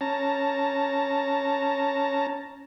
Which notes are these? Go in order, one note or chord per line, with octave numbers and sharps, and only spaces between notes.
C#4 A5 A#5